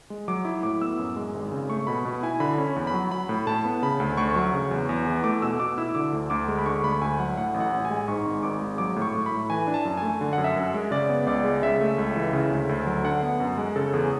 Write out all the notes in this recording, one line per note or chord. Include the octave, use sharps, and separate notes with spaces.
G#3
F#3 D6
E4 D6
A2 D6
B3 E6
F#2
G#3
G#1
C#3
A3 C#6
B2 B5
B2
E4 G#5
D3 B5
C#4
B5
E2
B5
F#3
F#3 B5
A2
A2 A5
B3
C#3 B5
D2
D2 C#6
F#3
C#3
E2
E2
E3
A3 D6
B2 E6
B2 D6
E4 E6
D3 D6
D2
D2 D6
G#3
B5
D3 C#6
D2 B5
D2 G#5
F#3 F#5
A2 F#5
A1
F#5
A1
G#5
G#3
G#2 C#6
G#1
G#1 D6
G#3
F#3 D6
A2
C#6
A2
B5
A3
E3 G#5
D4
A5
F#2
A3 G#5
D3
F#5
F#2
E5
F#2
G#3
C#3 D5
B3
C#2 D5
G#3
C#3 E5
A3
C#2
E3
C#3
D2
D2
F#3
D3 F#5
B3
F#2
G#3
C#3 A4
E2 G#4